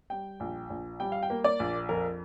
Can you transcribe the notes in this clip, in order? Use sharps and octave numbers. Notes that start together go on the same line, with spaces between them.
G3 G5
A#1
A#1
G3 G5
F5
G5
A#3
D5
A#1
F2 A#4